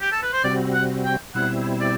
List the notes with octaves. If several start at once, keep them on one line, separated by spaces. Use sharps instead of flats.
G4
A4
B4
C5
C3 G3 C4 F#4 D5
F#5
G5
B2 G3 C4 E4 F#5
D5